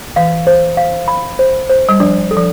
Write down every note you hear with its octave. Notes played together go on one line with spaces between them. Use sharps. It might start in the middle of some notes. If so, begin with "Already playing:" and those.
E3 F5
C5
F5
B5
C5
C5
G3
F3 D4
A4
F3